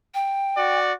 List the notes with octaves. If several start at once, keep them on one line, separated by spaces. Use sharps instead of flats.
G5
F#4 D5